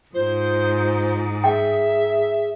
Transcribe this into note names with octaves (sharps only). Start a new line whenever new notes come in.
G#2 F4 C5
G#4 E5 G5